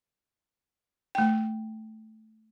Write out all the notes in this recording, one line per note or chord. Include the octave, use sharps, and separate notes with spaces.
A3 G5